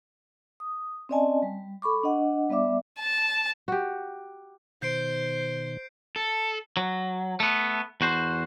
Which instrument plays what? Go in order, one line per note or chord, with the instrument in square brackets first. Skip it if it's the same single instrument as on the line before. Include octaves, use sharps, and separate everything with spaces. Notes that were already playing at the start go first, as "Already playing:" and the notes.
[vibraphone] D#6
C4 C#4 D5 D#5 G#5 A5
G3
A4 B5 C#6 D6
D4 D#5 F#5
G3 B3 D5 E5 D6
[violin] A5
[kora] F#4 G4
[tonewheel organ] B2 D#3 [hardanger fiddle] C5 [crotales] G6 C7 D7
[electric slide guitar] A4
[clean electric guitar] F#3
A3 B3
E2 F#4 C5